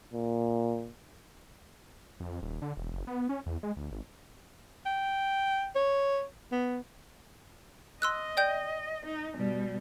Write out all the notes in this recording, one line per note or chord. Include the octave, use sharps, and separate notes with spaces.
A#2
F2
D#1
D3
E1
F#1
B3
C#4
E2
G#3
D2
G#1
G5
C#5
B3
D#5 C6 E6 F#6
D5 G5 G6
D#4
B2 G3